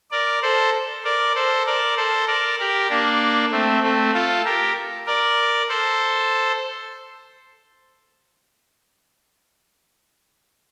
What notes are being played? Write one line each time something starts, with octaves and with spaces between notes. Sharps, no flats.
A#4 D5
A4 C5
A#4 D5
A4 C5
A#4 D5
A4 C5
A#4 D5
G4 A#4
A#3 D4
A3 C4
A3 C4
F4 A4
G4 A#4
A#4 D5
A4 C5